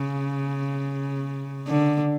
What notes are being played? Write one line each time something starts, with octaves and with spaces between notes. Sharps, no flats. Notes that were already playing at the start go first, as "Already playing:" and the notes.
Already playing: C#3
D3